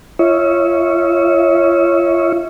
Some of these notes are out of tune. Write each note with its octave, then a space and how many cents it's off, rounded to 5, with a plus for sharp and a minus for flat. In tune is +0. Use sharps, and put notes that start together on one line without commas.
F4 -35 C#5 +0 E5 -40